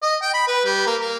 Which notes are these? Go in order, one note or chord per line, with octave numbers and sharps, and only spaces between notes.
D#5
G5
B5
B4
G3
A#3
A#3